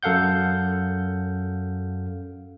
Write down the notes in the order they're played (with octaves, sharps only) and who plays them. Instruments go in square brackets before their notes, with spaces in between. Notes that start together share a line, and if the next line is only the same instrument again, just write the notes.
[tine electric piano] F#2 A4 F5 F#5 G6